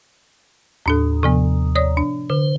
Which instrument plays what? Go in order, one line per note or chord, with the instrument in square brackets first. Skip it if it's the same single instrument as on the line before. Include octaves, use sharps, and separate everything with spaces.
[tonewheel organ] D#2 [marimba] A2 D4 A4
[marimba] C3 F3 B3
C#5 D5 D#6
D4
[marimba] D3 [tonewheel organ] C5